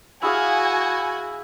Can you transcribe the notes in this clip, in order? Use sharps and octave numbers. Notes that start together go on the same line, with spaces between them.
E4 F#4 G#4 F5 G#5